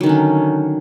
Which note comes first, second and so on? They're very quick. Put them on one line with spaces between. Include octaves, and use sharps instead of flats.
F#3 D#3 D3 C#4